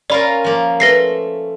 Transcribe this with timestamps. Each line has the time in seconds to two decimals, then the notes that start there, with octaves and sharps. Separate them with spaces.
0.10 C#4 F4 A#4 D5 B5
0.44 F3 A#3
0.80 A3 B4 A#6 C7